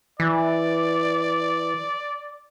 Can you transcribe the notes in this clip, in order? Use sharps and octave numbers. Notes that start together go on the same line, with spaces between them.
E3 D5